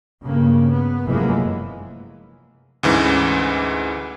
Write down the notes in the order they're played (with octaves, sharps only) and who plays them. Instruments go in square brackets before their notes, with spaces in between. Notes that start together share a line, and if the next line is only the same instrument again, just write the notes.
[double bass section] G2 C#3 A#3
B3
F1 F#2 E3 G#3 A#3
[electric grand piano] D2 G#2 E3 C#4